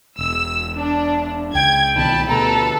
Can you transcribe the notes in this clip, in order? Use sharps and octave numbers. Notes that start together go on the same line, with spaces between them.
E1 E6
D4
C#2 G5 G#6
C2 B2 D#3 A5 B5
D2 B2 A4 B4 A#5